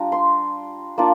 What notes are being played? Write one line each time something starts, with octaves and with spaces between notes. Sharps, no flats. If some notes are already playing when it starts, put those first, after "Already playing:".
Already playing: G3 D4 F4 A#5
C6
A#3 D4 F4